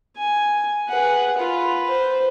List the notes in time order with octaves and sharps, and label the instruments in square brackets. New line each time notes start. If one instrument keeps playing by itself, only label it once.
[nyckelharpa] G#5
[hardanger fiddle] G#4 B4 [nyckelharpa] F#5
[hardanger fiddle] F4 [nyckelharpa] B4
[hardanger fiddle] C5